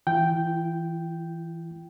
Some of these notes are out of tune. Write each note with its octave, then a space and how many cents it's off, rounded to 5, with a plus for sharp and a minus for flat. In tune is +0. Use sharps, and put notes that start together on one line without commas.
E3 +0 F4 -45 G5 -5